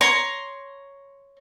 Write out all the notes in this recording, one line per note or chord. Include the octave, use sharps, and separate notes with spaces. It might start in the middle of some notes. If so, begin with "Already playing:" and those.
C#5 A#5 C6